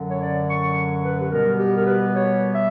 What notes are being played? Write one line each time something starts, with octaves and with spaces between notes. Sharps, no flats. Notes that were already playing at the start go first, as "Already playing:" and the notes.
Already playing: F#2 D3 F#3
C#5
D5
C#6
B4
G4
B2 G3 B3 A#4
G4
A#4
B4
C#5
E5